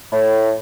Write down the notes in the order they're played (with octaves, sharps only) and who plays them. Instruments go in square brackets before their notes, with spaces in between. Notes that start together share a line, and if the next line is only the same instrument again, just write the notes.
[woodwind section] A2